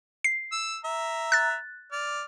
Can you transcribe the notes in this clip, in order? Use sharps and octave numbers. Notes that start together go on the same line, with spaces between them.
C7
E6
E5 A#5
F#6 A6
D5 F6